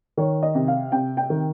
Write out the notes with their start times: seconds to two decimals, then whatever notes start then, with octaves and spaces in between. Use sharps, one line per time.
0.17 D#3 C#5
0.43 D#5
0.55 C3
0.68 F5
0.92 C3 G5
1.17 G5
1.30 D#3